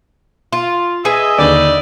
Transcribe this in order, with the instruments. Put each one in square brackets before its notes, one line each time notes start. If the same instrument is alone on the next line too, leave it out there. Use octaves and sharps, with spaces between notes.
[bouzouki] F4
[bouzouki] G#4 B4 G#5 [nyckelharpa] D#5 E5
[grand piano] D#2 D3 F#7 [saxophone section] G3 D5